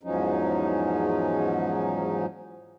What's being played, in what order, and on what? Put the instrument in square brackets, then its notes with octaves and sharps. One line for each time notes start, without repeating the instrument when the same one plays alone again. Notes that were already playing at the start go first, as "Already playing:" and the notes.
[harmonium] E2 G#2 F3 F#3 C#4 D#4